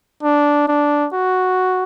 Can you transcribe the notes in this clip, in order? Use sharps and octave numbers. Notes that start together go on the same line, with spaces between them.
D4
D4
F#4